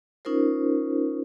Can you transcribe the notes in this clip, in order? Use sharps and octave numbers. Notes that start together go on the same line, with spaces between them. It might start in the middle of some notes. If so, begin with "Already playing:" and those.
C#4 D#4 F4 A#4 C5